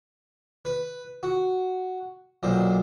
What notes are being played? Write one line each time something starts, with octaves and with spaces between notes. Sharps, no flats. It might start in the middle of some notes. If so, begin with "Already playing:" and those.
B4
F#4
B1 A#2 C5